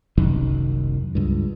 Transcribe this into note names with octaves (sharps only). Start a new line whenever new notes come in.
F#1 C2 F#2 D#3
C#2 G2